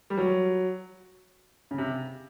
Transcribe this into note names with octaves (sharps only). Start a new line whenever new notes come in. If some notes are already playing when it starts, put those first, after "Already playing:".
G3
F#3
C#3
C3